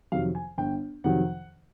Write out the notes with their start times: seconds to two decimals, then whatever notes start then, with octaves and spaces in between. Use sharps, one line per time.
0.12 F2 C3 D#3 F#3 F5
0.35 G#5
0.58 G1 G5
1.04 F2 C3 D#3 F#3 F#5